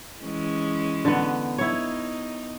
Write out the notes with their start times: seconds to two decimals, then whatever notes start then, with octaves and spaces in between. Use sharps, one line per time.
0.22 E3 G#3 C#4
1.05 D3 B3
1.58 D#4 E4 C#5